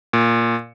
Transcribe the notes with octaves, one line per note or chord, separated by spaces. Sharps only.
A#2